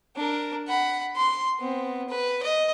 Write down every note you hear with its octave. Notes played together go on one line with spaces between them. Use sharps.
D4 A#4
F#5 B5
C6
B3 C4
B4
D#5